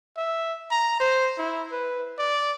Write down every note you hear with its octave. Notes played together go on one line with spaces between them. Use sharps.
E5
A#5
C5
E4
B4
D5